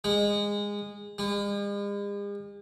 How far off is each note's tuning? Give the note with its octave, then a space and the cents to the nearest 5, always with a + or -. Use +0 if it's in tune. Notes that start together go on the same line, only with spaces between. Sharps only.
G#3 -20
G#3 -45